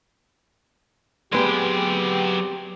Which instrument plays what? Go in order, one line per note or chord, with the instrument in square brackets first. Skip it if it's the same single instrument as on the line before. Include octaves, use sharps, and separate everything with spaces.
[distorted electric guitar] F#3 G5 [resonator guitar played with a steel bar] G#3 B4 [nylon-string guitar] B3 C4 [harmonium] G4